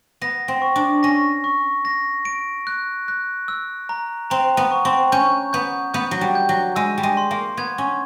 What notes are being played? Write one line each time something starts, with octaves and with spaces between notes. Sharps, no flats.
B3 A#6
C4
C#6
D4
C#4 A#6
C#6
A#6
D7
F#6
F#6
E6
A#5
C4 A#5
B3
C#6
C4
C#4 G6
B3 G6
B3 G6
F#3
G3
G6
F#3
G#3 E6
G3
G#3
C6
A#3
B3 G#6
C#4